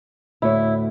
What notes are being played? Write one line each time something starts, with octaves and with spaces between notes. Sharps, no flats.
D2 A2 E4 C#5